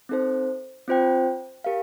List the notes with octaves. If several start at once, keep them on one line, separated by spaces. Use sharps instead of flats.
C4 D#4 A4 C5
C4 F4 C5 G5
G4 A#4 F5